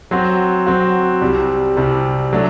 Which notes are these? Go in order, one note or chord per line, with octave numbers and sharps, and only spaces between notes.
F#3 C4 F#4
F#3 C4 F#4
C2 C3 G3
C2 C3 G3
F#3 A3 D4